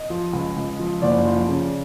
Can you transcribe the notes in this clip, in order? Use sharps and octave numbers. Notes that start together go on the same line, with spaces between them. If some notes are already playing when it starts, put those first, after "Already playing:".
Already playing: D#5
F3
C#2
C#2
F3
F#1 D5
F3
C#3